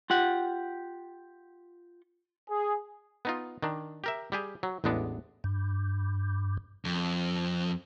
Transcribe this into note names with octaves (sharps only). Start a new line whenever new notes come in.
F4 G4 F#5
G#4
B3 D#4 F4
D#3 D4
G4 A#4 E5
G3 G4 G#4
F#3
A1 E2 G#3 B3 D4
G2
F2